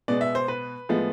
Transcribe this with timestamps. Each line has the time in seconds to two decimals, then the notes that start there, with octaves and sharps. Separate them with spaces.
0.08 B2 G#3 B3 D5
0.21 E5
0.35 C5
0.48 B4
0.89 A2 F3 G#3 B3